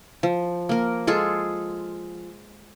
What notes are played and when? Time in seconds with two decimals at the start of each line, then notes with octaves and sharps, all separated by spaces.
0.23 F3
0.69 A#3 A#4
1.07 G#3 F4 G#4 A4